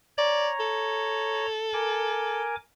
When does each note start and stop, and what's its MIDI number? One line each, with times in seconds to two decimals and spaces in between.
0.18 1.46 73
0.18 0.49 74
0.18 1.46 82
0.59 2.43 69
1.73 2.56 70
1.73 2.56 80
1.73 2.56 86